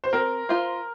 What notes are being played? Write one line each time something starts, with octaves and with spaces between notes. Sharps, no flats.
C5
C4 A#4
F4 C5